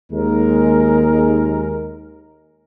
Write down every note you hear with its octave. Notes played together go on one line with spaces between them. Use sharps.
D#2 G#3 A#4